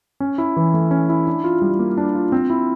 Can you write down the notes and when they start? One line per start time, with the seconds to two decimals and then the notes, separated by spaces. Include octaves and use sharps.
0.20 C#4
0.38 E4
0.57 E3
0.74 A3
0.91 C#4
1.09 E4
1.27 D4
1.44 F4
1.62 G3
1.79 A#3
1.97 D4
2.15 F4
2.32 C4
2.50 E4